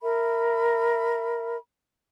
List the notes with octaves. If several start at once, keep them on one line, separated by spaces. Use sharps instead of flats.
A#4 E5 B5